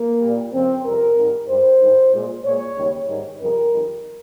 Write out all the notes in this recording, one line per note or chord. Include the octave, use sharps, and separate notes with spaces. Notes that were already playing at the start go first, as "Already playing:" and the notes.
Already playing: A#3
A#2 G3
F2 C#3 F3 C4
F2 C3 G3 A#4
G#2 D#3 G3
G2 G3 C5
G#2 D#3 G3
A#2 G#3
A#2 G#3 C#5
D#2 C#3 G3
G#2 D#3 G3
F2 C#3 G3 A#4
F2 D#3 G3